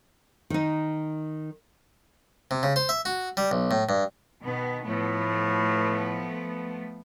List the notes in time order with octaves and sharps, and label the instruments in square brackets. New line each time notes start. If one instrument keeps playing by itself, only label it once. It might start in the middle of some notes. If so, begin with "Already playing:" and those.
[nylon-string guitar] D#3 D#4
[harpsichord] C3
C#3
C5
E5
F#4
G3
B1
A2
G2
[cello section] B2 D#3 B3
[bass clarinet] A2 [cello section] F3 A3 B3